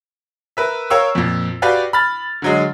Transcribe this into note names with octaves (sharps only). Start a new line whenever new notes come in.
A#4 B4 E5
A#4 C#5 F5 G5 C#6 E6
F2 A#2
F#4 G4 B4 D5 F5 G5
B5 F6 A6
D3 F#3 G#3